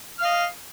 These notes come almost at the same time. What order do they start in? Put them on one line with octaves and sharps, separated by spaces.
F6 F5 D#5